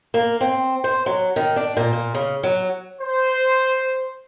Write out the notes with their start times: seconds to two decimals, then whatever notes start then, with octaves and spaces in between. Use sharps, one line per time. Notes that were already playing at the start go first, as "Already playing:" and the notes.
0.14 A#3
0.41 C4
0.84 C5
1.06 F#3
1.36 D#3
1.56 D4
1.77 A#2
1.93 A#2
2.14 C#3
2.43 F#3
3.02 C5